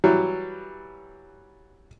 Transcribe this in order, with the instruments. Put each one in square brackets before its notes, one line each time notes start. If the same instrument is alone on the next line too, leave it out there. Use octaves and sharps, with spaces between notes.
[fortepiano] E3 F#3 G3